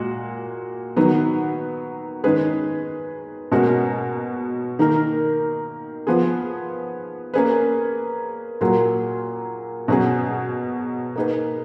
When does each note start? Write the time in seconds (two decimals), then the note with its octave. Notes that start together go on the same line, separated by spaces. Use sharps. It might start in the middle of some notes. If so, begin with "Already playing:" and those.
Already playing: A#2 G#3 F#4
0.96 D#3 F#3 B3
2.24 D#3 G#3 C#4 G#4 B4
3.52 B2 G#3 C#4 F#4 A#4
4.79 D#3 A#3 D#4 A#4
6.07 F3 B3 F4 G#4
7.34 A#3 C#4 G#4 B4
8.61 A#2 F#3 A#3 F4 G#4
9.88 B2 F#3 C#4 G#4
11.16 A#3 D#4 G#4 B4